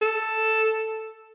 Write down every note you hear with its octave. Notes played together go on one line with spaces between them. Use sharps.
A4